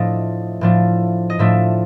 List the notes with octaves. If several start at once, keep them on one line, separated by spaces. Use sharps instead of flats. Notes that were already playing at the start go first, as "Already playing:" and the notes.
Already playing: A2 F3 A3 D4 D#5
A2 F3 A3 D4
D#5
A2 F3 A3 D4 E5